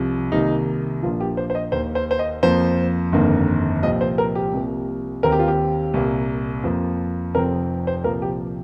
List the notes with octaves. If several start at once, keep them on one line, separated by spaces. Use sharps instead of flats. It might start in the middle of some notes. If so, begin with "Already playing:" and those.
Already playing: C2 C3 F3
C2 C3 D#3 A#3 D#4
A#1 A#2 F3 A#3 F4
G4
C5
C5
D#5
D#2 D#3 A#3 C5
C5
C5
D#5
F2 F3 A#3 C5
G1 F2 D#3 A#3
C2 A#2 F3 C4 D#5
C5
A#4
G4
C2 C3 F3 A#3
D#2 D#3 C4 A#4
G4
F4
G4
C2 A#2 A#3
F2 F3 A#3
F1 F2 F3 C4 A#4
C5
C2 A#2 F3 A#3 A#4
G4